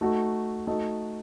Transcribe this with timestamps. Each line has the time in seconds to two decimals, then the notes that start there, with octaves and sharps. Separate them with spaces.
0.01 A3 D#4 F#4 A4
0.67 A3 D#4 F#4 A4 D#5